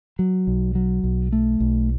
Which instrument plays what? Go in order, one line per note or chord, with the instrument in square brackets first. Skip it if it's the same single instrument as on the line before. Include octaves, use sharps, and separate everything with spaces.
[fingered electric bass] F#3
B1
F#3
B1
A3
B1